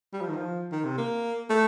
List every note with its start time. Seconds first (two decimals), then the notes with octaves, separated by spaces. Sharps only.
0.13 G3
0.21 F3
0.29 D#3
0.37 F3
0.72 D#3
0.84 C3
0.98 A#3
1.50 A3